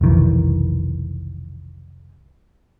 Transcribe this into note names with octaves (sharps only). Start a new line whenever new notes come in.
F1 B1 D#3 E3